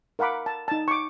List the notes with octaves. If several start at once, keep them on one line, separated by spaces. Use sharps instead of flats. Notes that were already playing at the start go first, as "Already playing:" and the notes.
A#4 F5 F#5 B5 D6
A5
D#4 A5
C#6 D6